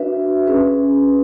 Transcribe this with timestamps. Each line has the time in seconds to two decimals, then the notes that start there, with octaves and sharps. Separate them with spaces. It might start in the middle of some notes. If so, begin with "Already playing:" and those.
Already playing: D4 F#4 B4 E5
0.47 C#4 G#4 B4